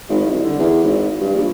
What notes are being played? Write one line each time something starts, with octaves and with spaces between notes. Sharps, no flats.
G#1
C2
D3
E2
G#1
G2
A#1